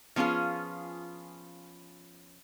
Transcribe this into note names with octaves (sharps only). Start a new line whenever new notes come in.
F3 B3 C#4 F4 G#4